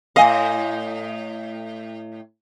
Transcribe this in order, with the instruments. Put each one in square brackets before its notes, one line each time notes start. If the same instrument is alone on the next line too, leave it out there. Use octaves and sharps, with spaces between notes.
[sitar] A2 D#5 [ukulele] F5 G#5